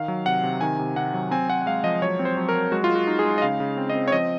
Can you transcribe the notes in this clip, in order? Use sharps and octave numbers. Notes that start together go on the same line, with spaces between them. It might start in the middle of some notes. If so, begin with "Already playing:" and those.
Already playing: D#3 F5
F#3
C3 F#5
C3
D#3 G#5
C3
C3 F#5
F#3
C4 G#5
C4 F#5
F#5
G#3 F5
F3 D#5
F#3 C#5
C4
C5
F#3
A#4
F#3
G#3 F#4
F4
G#3
F#4
D#4
G#4
G#3
D#5
C#3 F5
C#3
C4
D#5
C4
C#5
F3 D#5